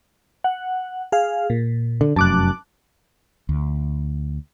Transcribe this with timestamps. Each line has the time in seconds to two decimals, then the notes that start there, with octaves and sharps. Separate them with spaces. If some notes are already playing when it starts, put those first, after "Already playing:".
0.44 F#5
1.12 G#4 F5
1.50 A#2
2.01 D3
2.16 F1 F#2 A5 D6 F#6
3.49 D2